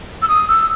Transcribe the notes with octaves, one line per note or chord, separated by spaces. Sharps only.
E6
D#6
E6